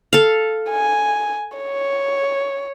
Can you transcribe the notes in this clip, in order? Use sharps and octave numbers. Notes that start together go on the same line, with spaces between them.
A4 F5
G#5
C#5